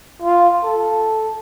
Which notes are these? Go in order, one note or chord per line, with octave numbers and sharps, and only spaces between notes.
F4
A4